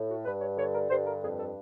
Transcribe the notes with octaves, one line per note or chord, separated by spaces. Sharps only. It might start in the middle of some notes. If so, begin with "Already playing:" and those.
Already playing: A2
F#4
G2 B4
C#5
D3 C#5
A#4
G2 C5
A#4
F2 G#4
A4